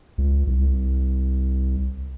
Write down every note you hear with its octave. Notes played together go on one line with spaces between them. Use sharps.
C#2
C2